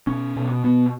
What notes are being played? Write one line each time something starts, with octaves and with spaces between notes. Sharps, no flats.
B2 C#4
B2
B2 B3